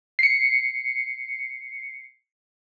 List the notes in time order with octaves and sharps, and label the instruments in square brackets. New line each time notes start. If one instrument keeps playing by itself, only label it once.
[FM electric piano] C7 C#7